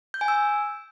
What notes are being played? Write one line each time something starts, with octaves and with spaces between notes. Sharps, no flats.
G6
G#5
E6